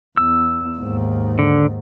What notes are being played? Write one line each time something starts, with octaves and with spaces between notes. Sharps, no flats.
E2 E6
D#2 G#2
D3